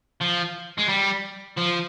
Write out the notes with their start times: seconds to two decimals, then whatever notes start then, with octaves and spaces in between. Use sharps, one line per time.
0.21 F3
0.78 G#3
0.89 G3
1.58 F3